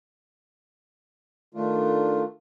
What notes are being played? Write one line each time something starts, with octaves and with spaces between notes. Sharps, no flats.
D#3 A3 D4 F4